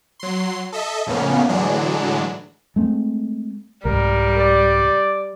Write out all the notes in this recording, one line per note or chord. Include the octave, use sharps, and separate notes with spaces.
F#3 C6
A4 D#5 E5
F2 A2 C#3 A#3 B3 C#4
A2 D3 E3 F#3 G#3 D4
G#3 A3 C4
C2 G#2 G3 A#4
D5